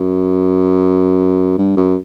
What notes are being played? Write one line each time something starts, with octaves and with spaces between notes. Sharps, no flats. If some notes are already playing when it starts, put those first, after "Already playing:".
Already playing: F#2
G2
F#2